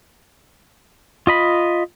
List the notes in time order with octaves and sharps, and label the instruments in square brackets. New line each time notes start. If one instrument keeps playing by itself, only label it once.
[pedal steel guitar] F4 D#5 B5